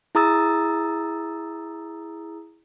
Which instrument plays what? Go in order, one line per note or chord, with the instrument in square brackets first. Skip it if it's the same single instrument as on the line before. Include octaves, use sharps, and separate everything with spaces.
[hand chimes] E4 G#4 A#5 D#6 E6 A6